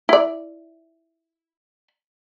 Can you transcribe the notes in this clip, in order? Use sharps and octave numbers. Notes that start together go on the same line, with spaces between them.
E4 D5